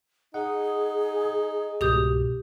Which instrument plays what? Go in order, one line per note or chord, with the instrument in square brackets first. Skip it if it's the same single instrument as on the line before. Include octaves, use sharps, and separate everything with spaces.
[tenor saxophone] D#4 [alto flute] G#4 [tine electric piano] F#5
[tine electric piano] C2 G#2 B2 [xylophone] G4 D#6 G6